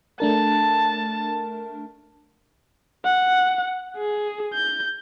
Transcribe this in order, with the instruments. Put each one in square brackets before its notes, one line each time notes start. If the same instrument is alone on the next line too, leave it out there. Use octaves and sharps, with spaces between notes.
[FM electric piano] A3 D4 A#4 [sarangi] A5
[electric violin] F#5
G#4
G6